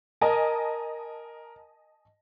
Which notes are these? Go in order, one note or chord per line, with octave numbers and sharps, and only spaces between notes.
A#4 D#5 G#5 A5